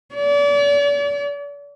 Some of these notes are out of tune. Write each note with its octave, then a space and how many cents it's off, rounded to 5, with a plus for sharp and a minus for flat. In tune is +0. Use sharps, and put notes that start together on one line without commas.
D5 -40